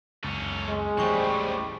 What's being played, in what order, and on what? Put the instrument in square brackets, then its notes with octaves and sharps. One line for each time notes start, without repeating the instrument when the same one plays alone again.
[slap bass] C#2 F#2 [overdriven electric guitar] C#4 A4
[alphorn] G#3
[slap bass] A1 D#2 [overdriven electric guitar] A2 G3 [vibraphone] C5 G5 C#6